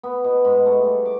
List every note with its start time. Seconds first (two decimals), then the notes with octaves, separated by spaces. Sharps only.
0.03 B3
0.24 B2
0.45 G#2
0.66 A3
0.84 G3
1.05 D6